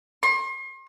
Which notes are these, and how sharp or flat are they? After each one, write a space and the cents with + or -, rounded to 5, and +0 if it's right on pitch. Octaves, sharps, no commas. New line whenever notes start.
C6 +40